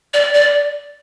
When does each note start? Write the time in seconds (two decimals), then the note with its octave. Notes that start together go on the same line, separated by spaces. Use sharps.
0.14 D5
0.34 D5